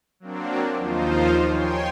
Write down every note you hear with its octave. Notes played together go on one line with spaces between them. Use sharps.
F#3 A#3 C4 D4
D#2 F3 D#4 F4 C5
C#5 G5 G#5 C6